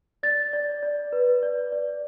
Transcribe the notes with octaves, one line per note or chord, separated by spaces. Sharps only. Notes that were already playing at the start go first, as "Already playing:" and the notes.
D5 A6
D5
D5
B4
D5
D5